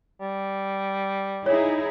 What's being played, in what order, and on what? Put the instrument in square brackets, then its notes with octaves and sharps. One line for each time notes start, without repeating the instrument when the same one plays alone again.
[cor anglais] G3
[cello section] D#4 E4 G#4 [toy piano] C#5